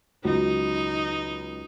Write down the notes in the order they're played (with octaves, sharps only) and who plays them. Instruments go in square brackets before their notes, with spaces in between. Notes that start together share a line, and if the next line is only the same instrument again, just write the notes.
[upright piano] C#2 F#3 [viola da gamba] D#4